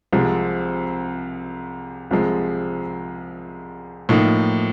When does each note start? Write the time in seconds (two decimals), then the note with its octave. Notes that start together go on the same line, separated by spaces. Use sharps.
0.12 C2 C3 F3 G#3 C4
2.11 C2 C3 F3 G#3
4.09 A2 F3 A#3 D#4